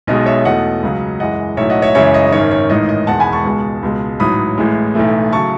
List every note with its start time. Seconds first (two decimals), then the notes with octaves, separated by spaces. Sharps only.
0.07 B1 B2 G#3 D#5
0.26 C#5 E5
0.45 E2 B2 A3 D#5 F#5
0.83 C#2 C#3 F#3
1.20 F#2 E3 G#3 D#5 F#5
1.57 B1 A2 F#3 C#5 E5
1.70 D#5 F#5
1.82 C#5 E5
1.95 F#2 C#3 E3 G#3 C#5 E5
2.14 D#5
2.32 G#1 F#2 D#3 C#5
2.51 C#5
2.70 A1 G#2 D#3 D#5
2.89 D#5
3.07 E1 E2 D#3 G#3 F#5 A5
3.20 G#5 B5
3.32 A5 C#6
3.45 C#2 B2 G#3
3.83 C#2 B2 G#3
4.20 A1 G#2 F#3 B5 D#6
4.58 A1 A2 G#3
4.95 B1 A2 E3 A3
5.32 C#3 F#3 A3 A5 C#6